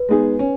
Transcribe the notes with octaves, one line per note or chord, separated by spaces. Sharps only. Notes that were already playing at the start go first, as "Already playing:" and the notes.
Already playing: B4
G#3 B3 D#4 G#4
C#4